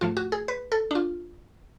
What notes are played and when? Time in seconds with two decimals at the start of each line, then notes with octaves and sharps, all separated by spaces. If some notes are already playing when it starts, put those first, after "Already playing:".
0.01 G#2 F3 A3 F4
0.17 F#4
0.32 G#4
0.48 B4
0.72 A4
0.91 D4
0.95 F4